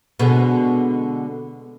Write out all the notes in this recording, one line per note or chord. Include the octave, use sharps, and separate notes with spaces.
B2 D3 G#3